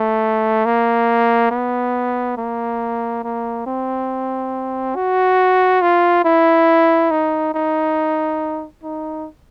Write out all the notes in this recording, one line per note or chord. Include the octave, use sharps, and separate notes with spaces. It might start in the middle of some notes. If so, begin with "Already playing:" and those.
Already playing: A3
A#3
B3
A#3
A#3
C4
F#4
F4
E4
D#4
D#4
D#4